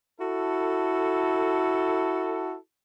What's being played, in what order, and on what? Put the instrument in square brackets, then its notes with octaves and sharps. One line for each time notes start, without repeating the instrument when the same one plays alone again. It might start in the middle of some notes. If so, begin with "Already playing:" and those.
[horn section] E4 F#4 A4